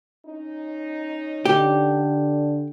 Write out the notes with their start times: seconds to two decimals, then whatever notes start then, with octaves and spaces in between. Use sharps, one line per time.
0.26 C#4 D#4
1.45 D3 G4